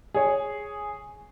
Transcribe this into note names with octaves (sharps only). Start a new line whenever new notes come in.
G#4 C#5